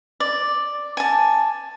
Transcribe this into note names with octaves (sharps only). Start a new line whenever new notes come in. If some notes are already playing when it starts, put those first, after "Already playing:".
D5
G#5 A5